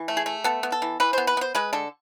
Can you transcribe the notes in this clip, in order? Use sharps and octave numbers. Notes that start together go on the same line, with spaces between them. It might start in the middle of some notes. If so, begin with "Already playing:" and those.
Already playing: E3
A3
G#4
A3
B3 A4
B3
A4
E3
E3 B4
B3 C5
B4
B3 C5
G#3 B4
D3 A4